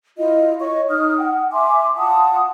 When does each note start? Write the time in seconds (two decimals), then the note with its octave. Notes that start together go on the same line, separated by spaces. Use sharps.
0.18 E4 F4 D#5
0.60 C#5 D#5 C#6
0.89 D#4 D#6 F6
1.18 F#5 G5
1.52 E5 G#5 C6 D6
1.96 F4 F#5 A5 D#6